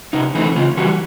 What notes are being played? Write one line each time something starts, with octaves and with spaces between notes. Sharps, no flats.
C3 D#4
E3 A3 C4 D#4
C#3 F4
E3 G3 F#4